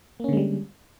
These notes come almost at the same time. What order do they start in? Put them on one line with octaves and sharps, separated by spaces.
A#3 C#4 D3 G#3 G3